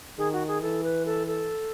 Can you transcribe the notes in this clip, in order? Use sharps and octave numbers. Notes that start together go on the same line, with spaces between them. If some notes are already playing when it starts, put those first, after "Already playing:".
D#3 G#4
F#4
G#4
E3 A4
B4
A4
A4